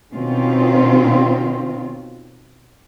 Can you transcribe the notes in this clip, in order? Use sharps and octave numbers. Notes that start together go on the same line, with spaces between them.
B2 D#3 C4 C#4 F4